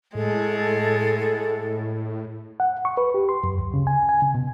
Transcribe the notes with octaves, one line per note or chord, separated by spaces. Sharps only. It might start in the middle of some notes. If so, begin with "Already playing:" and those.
A2 G#3 A4
F#5
C#6
B4
G4
C6
F#2
D2
C#3
G#5
G#5
C#3
B2